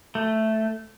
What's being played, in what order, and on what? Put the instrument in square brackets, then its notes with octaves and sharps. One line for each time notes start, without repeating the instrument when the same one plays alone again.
[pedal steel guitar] A3